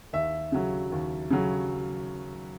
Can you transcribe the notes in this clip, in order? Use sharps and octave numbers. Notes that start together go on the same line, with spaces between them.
D#2 E5
C#3 F#3
D#2
C#3 F#3